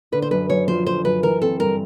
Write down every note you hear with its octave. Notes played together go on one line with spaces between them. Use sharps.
D3 B4
C5
F#2 B4
F#2 C#5
F3 C5
D3 C5
F#2 B4
E3 A#4
C4 A4
G2 A#4